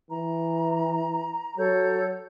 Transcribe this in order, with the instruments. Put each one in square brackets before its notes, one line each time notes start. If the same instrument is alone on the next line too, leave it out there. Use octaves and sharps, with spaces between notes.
[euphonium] E3 [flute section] A#5
[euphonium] F#3 [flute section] A4 C#5 G6